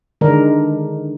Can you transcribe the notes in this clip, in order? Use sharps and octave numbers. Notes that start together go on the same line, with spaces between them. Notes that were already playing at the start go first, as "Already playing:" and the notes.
D3 D#3 G#3 D4 A#4